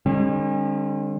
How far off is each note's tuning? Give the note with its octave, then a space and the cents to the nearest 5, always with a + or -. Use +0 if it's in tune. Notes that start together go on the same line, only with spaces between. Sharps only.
D3 +30 G#3 -45 C#4 -40